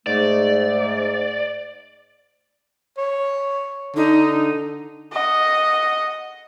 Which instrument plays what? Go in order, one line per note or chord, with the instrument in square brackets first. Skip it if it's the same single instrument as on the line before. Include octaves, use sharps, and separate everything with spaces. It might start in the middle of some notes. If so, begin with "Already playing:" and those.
[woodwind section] G#2 A3 [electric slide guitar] D5
[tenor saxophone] C#5
[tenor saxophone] D3 [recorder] D#4
[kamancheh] D#5 F#5